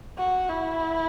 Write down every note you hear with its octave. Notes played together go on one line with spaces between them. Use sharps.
F#4
E4